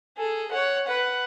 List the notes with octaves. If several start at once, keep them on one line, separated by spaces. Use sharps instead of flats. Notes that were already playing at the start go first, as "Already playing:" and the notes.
G#4 A4
C#5 F#5
B4 F#5